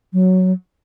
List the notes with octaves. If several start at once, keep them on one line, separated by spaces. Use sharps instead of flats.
F#3